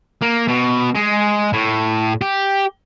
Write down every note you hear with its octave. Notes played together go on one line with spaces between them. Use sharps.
A#3
B2
G#3
A2
G4